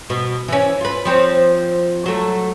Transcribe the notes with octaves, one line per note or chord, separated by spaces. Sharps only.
B2
E3 C#4
F4 B4
F3 C4 C#5
F#3 A3